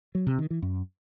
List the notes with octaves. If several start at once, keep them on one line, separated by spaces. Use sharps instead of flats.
F#3
C3
D#3
E3
F#2